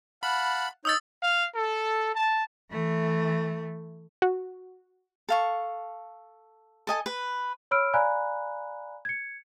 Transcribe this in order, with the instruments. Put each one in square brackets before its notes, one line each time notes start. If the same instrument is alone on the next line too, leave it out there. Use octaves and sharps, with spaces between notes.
[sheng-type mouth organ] F5 F#5 A5 [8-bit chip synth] B5
[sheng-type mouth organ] D#4 C#5 G6 [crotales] D#6 E6 A6
[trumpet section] F5
A4
A5
[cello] E3 A3
[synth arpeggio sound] F#4
[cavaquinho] A4 F5 C#6
A4 D#5 G#5 A5
B4
[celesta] C#5 B5 E6 F6 D7
D5 F5 G#5 A#5 B5 F#6
G#6 C#7